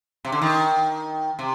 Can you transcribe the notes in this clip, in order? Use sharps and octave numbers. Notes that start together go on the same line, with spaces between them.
C3
D3
D#3
C3